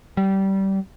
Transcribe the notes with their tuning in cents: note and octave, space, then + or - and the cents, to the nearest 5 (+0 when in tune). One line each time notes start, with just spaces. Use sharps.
G3 -20